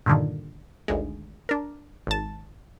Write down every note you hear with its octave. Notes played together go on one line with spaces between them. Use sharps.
G2 A#2 D3 D#3
G#1 D2 G#3
D4 A#4
G#1 A5